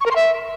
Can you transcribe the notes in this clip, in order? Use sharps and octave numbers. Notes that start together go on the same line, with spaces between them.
C#6
A#4
C6
E5